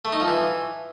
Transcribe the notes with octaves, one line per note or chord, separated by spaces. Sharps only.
A3
D#4
F3
E3